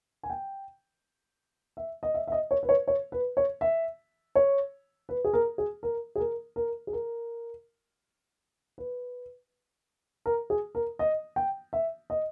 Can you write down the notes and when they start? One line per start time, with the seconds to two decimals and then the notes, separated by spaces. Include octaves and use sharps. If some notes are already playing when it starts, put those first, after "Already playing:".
0.23 G#5
0.30 G5
1.77 E5
2.03 D#5
2.14 E5
2.27 E5
2.32 D#5
2.51 C#5
2.63 B4
2.69 C#5
2.88 C#5
3.12 B4
3.37 C#5
3.61 E5
4.35 C#5
5.09 B4
5.25 G#4
5.34 A#4
5.58 G#4
5.83 A#4
6.15 G#4
6.20 A#4
6.56 A#4
6.87 G#4
6.93 A#4
8.78 B4
10.26 A#4
10.50 G#4
10.75 A#4
10.99 D#5
11.36 G5
11.73 E5
12.10 D#5